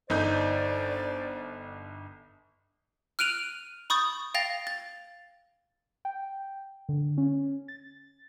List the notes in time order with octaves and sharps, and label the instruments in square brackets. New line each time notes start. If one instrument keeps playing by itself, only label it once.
[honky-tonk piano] G1 D#4 G6 [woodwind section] C5 D5
[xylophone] F6 F#6 D7 D#7 F7 F#7
B5 C#6 D#6 G6 A6
F5 G5 A6 A#6 F7
A6
[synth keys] G5
D3
C#4
A6